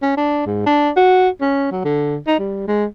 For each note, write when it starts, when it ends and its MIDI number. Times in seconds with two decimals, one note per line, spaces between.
0.02 0.17 61
0.17 0.41 62
0.46 0.61 44
0.66 0.90 62
0.96 1.29 66
1.41 1.71 61
1.72 1.80 54
1.85 2.17 50
2.27 2.35 63
2.39 2.68 55
2.68 2.85 56